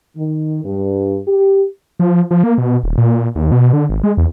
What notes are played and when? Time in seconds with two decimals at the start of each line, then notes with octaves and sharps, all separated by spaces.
0.16 D#3
0.65 G2
1.27 G4
1.99 F3
2.31 F3
2.44 A#3
2.58 B2
2.83 D#1
2.98 A#2
3.35 D#2
3.52 B2
3.73 D3
3.90 G#1
4.04 G#3
4.17 E2